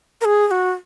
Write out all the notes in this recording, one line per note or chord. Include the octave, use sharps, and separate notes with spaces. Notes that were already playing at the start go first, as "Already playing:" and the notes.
A#4
G#4
G#4
F#4